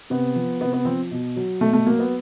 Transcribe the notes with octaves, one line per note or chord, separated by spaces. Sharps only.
C3 B3
F3
C3 B3
B3
F3 C4
B2
F#3
B2 A3
A3
F#3 A#3
B3